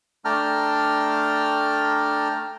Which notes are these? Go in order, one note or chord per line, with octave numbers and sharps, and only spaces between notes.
A3 D4 G5 A5 A#5 F6